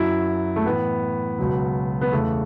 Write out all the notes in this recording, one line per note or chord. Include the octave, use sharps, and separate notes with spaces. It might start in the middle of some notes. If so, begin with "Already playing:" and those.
Already playing: F#2 F#3 E4
A3
A2 E3 B3
C#2 B2 F#3
B3
E2 C#3 E3 A3